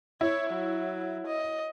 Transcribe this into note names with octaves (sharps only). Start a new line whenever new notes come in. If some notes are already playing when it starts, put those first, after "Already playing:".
E4 C#5
F#3
D#5